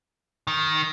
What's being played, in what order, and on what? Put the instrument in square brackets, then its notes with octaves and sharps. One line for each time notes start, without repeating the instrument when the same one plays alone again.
[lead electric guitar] D#3